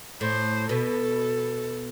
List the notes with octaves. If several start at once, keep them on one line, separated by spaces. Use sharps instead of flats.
A2 C5
B2 A4